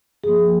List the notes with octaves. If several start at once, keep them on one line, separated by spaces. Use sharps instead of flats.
G2 F3 A#3 G#4